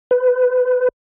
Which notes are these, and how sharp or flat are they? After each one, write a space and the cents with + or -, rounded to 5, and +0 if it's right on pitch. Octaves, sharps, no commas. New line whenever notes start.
B4 +25